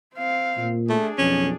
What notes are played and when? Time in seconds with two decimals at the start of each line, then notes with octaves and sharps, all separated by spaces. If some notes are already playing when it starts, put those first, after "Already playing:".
0.14 C4 F5
0.57 A#2
0.90 A3 D4 G#4
1.18 B1 F2 C#4